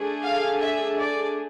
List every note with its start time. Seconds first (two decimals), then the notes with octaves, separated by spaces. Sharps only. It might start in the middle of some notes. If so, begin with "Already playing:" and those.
Already playing: A3 D4 G#4
0.24 F5
0.62 E5
1.00 D5